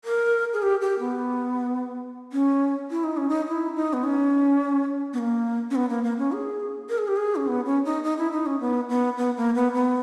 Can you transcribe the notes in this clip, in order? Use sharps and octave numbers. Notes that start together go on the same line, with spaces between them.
A#4
G#4
G4
G4
B3
C#4
E4
D#4
C#4
D#4
E4
D#4
B3
C#4
B3
A#3
C#4
B3
A#3
A#3
C#4
G#4
A#4
G#4
G4
G#4
C#4
B3
C#4
D#4
D#4
E4
D#4
C#4
B3
B3
B3
A#3
B3
B3